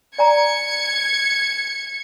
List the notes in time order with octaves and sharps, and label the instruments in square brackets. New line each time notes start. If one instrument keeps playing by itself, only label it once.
[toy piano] D5 G#5 A#5 [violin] G#6 C#7